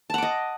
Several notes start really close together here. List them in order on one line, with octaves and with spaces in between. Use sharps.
A5 F#5 D6 D#5